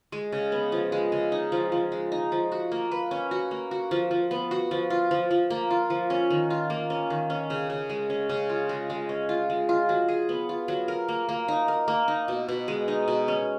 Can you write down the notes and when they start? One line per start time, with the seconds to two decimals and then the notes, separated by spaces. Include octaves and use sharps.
0.12 G#3
0.32 C#3
0.52 B3
0.72 F3
0.92 G#3
1.12 C#3
1.32 D#4
1.52 F3
1.72 F3
1.92 G#3
2.12 D#4
2.32 F3
2.52 F#4
2.72 A#3
2.91 B4
3.11 C#4
3.31 F#4
3.51 A#3
3.71 F#4
3.91 F3
4.11 F3
4.31 B3
4.51 F#4
4.71 F3
4.90 F4
5.11 F3
5.31 F3
5.50 A#3
5.71 F4
5.90 F3
6.10 C#4
6.30 D#3
6.50 F4
6.70 A#3
6.90 C#4
7.10 D#3
7.30 C#4
7.50 C#3
7.70 C#3
7.90 G#3
8.10 C#4
8.29 C#3
8.50 F4
8.69 G#3
8.90 G#3
9.09 C#4
9.29 F4
9.50 G#3
9.69 F4
9.89 F#3
10.08 G#4
10.29 B3
10.49 F4
10.68 F#3
10.88 A#4
11.08 A#3
11.29 A#3
11.48 D#4
11.68 A#4
11.88 A#3
12.08 D#4
12.28 B2
12.48 B2
12.68 G#3
12.88 D#4
13.08 B2
13.28 C#4